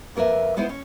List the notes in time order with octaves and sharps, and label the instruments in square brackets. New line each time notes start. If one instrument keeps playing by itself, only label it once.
[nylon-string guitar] F2 A#3 A#4 B4 E5
G#3 B3 D#4 E4 C5
C#4